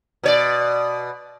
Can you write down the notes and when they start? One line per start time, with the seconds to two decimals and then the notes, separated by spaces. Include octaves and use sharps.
0.23 B2 C#5 D5